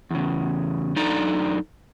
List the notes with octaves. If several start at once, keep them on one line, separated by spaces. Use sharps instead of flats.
E2 C#3
F#2 D4 D#4 A4 D5 A#5